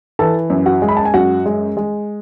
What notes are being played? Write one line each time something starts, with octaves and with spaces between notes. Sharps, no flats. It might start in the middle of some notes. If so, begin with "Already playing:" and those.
E3 A4 A5
F#2
F#4 F#5
G#3
B5
A5
G#5
F#2 F#4 F#5
G#3
G#3